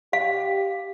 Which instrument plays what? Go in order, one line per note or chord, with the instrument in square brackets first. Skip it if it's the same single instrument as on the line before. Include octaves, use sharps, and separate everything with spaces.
[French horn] G4 [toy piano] F5